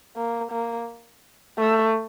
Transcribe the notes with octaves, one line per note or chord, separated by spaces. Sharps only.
A#3
A#3
A3